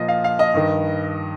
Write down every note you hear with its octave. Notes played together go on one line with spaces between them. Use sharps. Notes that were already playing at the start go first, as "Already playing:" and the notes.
Already playing: A#2 F3 D#5
F5
F5
D#5
G2 D#3